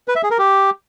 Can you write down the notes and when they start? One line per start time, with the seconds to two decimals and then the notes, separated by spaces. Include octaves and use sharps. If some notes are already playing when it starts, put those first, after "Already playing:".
0.08 B4
0.16 E5
0.23 G#4
0.31 A#4
0.38 G4